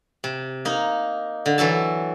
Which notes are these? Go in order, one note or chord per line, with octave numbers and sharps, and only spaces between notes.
C3
A#3 D#4
D3
E3 F#3 A4 A5